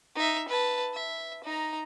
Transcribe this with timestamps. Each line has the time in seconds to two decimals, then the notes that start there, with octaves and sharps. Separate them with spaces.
0.15 D#4 E5
0.48 B4 A5
0.94 E5
1.44 D#4 A#5